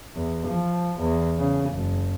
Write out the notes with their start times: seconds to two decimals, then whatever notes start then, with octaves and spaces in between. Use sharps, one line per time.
0.16 E2
0.47 F3
0.99 E2
1.39 C#3
1.70 F#1